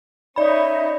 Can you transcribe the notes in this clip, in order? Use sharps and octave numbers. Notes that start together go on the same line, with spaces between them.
C#4 D#4 C#5 D5 E5 B5